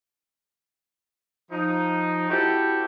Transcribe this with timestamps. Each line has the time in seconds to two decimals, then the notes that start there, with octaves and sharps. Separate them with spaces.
1.51 F3 D#4
2.30 C4 E4 F#4 G4 A4 G5